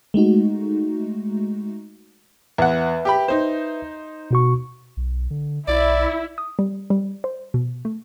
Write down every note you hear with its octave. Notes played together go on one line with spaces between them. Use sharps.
G#3 A3 D#4 F#4
E2 B4 E5 F#5
G4 G5 B5
D#4 C5
B2 F#4 C#6
B1
D3
B1 E4 D5
D#6
G3
G3
C5
B2
A3